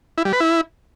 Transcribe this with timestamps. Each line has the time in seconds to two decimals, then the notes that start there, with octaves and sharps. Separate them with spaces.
0.18 E4
0.25 G3
0.33 B4
0.40 E4